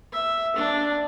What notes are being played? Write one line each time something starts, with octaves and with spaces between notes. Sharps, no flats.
E5
D4